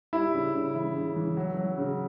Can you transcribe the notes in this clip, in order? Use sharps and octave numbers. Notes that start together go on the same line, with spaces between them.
G3 E4
C#3
C#3
E3 E4
C#3
E3
F#3
F#3
C#3